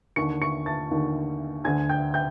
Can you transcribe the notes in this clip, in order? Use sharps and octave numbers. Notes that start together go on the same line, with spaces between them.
D#2 D3 C#6 C#7
C#6 C#7
A5 A6
D#2 D3
D2 D3 G#5 G#6
G5 G6
G5 G6